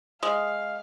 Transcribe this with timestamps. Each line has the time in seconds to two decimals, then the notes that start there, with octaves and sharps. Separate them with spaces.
0.23 G#3 F5 D#6